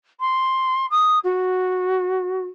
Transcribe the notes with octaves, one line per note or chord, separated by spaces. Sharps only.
C6
D#6
F#4